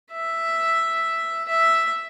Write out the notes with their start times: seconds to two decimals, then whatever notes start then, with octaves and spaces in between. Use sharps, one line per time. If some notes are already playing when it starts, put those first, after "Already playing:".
0.12 E5
1.48 E5